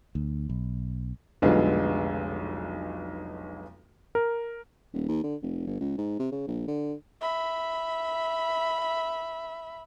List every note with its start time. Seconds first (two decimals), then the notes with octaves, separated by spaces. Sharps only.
0.15 D2
0.49 B1
1.42 F1 B1 D3 G#3 B3 F4
4.15 A#4
4.94 D#1
5.08 D#2
5.24 D3
5.42 F1
5.67 G1
5.81 C#2
5.98 G#2
6.19 C3
6.32 C#3
6.47 A#1
6.68 D3
7.21 E5 B5